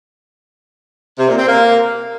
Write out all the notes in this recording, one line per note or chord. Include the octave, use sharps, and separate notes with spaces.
C3
A#2
C4
A#3